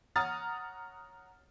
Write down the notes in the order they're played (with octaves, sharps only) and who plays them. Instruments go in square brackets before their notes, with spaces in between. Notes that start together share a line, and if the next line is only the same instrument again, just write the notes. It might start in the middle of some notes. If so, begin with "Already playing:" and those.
[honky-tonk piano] C#5 F#5 A#5 D#6 F6 A6